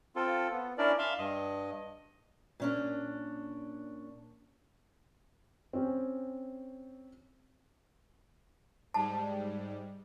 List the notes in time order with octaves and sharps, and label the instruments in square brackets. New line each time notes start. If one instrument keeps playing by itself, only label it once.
[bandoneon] C4 F4 A4
B3
C#4 D4 E4 A#4 D5
E5 F5 C6
G2 D#5
[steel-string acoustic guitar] A#2 C#4 D4
[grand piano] C4 C#4 G4
[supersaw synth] G#2 G3 [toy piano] A5